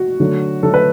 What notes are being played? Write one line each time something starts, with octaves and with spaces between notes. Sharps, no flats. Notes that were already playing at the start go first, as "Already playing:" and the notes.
Already playing: F#4
D3 F#3 A3
D3 F#3 A3 A4
B4